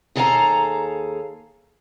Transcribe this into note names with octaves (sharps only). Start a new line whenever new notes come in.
D#2 G#4 A4 F5 G5 A#5